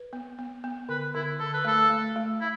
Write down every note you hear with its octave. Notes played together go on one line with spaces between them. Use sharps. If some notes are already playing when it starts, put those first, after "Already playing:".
Already playing: B4
B3
B3
B3
D3 B4
D3 E4
D3 A4
B4
A3 A4
A3
A3
E4